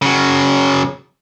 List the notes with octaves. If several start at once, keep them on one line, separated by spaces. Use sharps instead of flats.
C#3 F#3